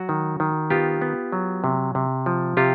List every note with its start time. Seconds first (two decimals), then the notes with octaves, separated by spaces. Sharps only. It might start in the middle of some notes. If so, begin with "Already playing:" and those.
Already playing: F#3 F#4
0.09 D#3
0.40 D#3
0.70 B3 F4 G4
1.01 B3
1.32 F#3
1.64 C3
1.95 C3
2.26 F3
2.57 C3 F4 G4